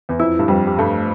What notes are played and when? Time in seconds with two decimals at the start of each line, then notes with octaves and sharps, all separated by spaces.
0.09 E2
0.20 F2 E4
0.39 G2
0.48 F2 G3
0.67 G3
0.79 G2 A3